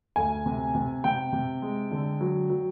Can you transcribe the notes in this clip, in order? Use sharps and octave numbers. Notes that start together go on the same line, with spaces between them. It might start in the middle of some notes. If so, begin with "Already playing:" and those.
D2 G#5
C3
C3
C3 G5
C3
G#3
D3
F#3
F#3